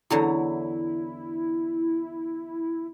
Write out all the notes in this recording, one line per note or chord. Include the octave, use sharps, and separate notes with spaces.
E2 D3 F#3 E4